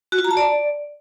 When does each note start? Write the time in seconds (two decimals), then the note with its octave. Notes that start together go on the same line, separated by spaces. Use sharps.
0.12 F#4
0.18 F4
0.25 A#5
0.31 A5
0.37 D5